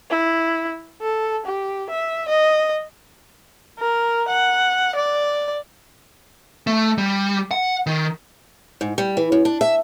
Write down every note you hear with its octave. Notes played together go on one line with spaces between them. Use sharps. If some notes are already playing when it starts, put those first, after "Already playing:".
E4
A4
G4
E5
D#5
A#4
F#5
D5
A3
G3
F#5
D#3
G#2
G3
E3
F#2
D4
E5